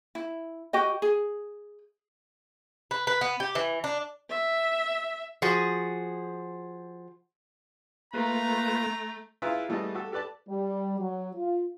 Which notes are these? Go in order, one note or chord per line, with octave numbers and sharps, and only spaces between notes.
E4
F#4 G4 D#5
G#4
B4
B4
B3
G4
E3
D4
E5
F3 F#4 G#4
A3 A#3 F4 B4 A#5
E4 F4 G#4 B4 E5 A#5
E3 G3 A3 B3 G#4 D#5
F#4 G4 A4
G4 A4 B4 D5 A5
G3
F#3
F4